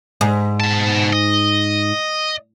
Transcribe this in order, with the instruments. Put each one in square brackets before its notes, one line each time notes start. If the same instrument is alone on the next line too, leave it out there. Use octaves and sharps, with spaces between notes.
[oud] G#2
[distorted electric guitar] B2 A5
D#5